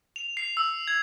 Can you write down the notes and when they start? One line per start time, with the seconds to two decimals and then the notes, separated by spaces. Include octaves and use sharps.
0.16 F7
0.37 C7
0.57 E6
0.88 G#6